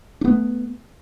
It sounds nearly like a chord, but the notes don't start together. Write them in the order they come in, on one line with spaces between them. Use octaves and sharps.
D4 B3 A3